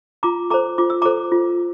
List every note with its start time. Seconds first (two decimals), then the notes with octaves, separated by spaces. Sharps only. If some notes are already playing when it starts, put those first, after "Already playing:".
0.23 F4 A#5 D6
0.50 A4 C5 A#5 D6
0.78 F4 D6
0.90 E6
1.02 A4 C5 A#5 D6
1.32 F4